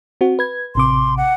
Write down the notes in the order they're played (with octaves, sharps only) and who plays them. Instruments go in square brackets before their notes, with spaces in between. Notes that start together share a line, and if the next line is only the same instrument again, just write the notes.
[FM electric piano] C4 F#4
B4 G#6
[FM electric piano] A1 C3 D6 [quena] C6
[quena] F#5